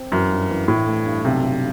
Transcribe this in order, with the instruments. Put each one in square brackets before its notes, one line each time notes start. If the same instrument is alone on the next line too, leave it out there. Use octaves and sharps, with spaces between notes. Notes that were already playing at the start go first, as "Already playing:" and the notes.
Already playing: [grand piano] C4
[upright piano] F#2 [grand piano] E3
[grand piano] G2
E3
[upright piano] A2 [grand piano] E3
[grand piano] A3
G2
[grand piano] B1 [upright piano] C3
[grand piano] B1